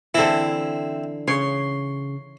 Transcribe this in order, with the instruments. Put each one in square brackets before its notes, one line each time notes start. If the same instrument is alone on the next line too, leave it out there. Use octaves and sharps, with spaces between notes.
[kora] D3 E3 [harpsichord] C4 E4
[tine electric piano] C#3 [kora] C#5 [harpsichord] C6